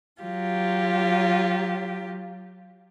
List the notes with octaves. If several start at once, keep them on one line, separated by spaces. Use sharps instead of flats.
F#3 F4 G4